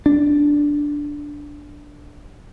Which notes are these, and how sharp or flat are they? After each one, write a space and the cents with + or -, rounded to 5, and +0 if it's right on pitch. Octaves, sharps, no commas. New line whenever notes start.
D4 -5